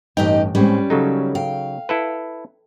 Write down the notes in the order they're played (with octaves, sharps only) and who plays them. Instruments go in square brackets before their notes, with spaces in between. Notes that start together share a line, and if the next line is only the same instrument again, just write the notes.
[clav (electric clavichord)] A1 G5 [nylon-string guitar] G2 C#4 [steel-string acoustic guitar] D#4 G4 D#5
[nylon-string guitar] A2 G#3 C4 [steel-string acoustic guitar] G3 C#4 B4
[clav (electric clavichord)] C#3 F#3 D#4 [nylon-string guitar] A4
[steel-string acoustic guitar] F5 [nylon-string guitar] G5
[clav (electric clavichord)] E4 A4 B4